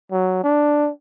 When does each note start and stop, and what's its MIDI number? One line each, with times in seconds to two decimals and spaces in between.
0.12 0.42 54
0.43 0.90 62